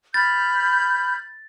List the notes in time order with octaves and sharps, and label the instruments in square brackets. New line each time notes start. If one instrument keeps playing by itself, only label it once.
[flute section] B5 F6 G6 [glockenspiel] A6